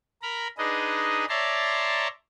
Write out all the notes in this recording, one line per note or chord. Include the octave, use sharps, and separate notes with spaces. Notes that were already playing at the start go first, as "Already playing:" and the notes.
A#4 A#5 B5
D4 D#4 G#4 B4 D#5
C#5 D5 E5 A5 A#5 C6